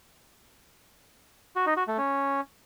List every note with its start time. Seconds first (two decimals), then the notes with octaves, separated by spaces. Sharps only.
1.56 F#4
1.66 D#4
1.77 F#4
1.87 A3
1.98 C#4